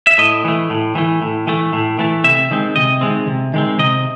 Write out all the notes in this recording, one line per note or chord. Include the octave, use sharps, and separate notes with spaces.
E5
A2 D#5
E3 A3
A2
E3 A3
A2
E3 A3
A2
E3 A3
C3 E5
D#3 G#3 C4
C3 D#5
D#3 G#3 C4
C3
D#3 G#3 C4
C3 D#5